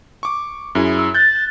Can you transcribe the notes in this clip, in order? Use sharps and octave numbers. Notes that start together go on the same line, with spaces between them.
C#6 D6
F#2 E4 G#4
E6
F#6 G6 A6